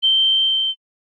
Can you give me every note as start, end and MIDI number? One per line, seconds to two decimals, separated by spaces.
0.03 0.70 103